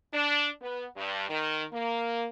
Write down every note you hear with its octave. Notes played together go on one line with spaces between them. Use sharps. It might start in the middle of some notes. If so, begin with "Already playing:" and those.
D4
B3
G2
D#3
A#3